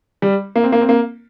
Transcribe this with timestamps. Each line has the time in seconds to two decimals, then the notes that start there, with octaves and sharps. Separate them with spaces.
0.22 G3
0.56 A#3
0.64 C4
0.72 A#3
0.81 C4
0.89 A#3